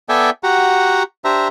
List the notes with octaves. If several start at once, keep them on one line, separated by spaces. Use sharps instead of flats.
B3 A4 D5 E5 G5 G#5
F#4 G4 F#5 A#5
D4 G4 C5 E5 A#5